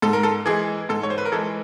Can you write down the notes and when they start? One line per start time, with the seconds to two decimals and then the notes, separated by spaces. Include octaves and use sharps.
0.02 G#2 A4
0.13 A#4
0.23 A4
0.46 E3 G#3 G#4
0.89 G#2 A4
1.03 C#5
1.10 C5
1.18 B4
1.25 A#4
1.32 E3 G#3 A4